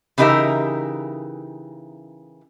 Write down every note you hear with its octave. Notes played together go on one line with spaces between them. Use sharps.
C#3 E3 D#4 G4 A#4 E5